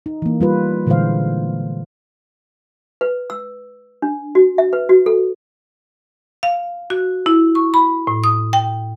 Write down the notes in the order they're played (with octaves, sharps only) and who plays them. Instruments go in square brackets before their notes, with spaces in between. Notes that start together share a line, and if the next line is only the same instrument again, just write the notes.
[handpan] D#4
E3 A#3
G3 F4 B4
A#2 D3 E3 G#3 C5 F5
[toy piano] B4
E6
D4
F#4
E5
B4
F#4
A4
[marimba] F5
F#4
E4
C#6
B5
A2
D#6
G5